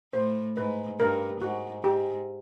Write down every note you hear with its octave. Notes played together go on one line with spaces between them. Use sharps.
A2 C5
G#2 B4
G2 A#4
G#2 F#4
G#2 G4